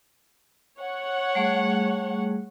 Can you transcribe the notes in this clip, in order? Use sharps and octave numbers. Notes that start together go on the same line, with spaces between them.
C#5 F#5
G3 A3 G#4